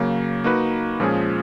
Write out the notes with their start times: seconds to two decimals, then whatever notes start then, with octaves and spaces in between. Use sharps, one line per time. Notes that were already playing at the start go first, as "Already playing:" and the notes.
Already playing: C#3 F#3 A#3
0.44 A#3 D#4 F#4 B4
1.00 A#2 F3 G#3 C#4 G#4